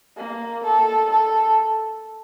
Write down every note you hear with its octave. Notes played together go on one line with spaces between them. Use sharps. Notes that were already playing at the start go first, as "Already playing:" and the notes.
A#3
A4
A4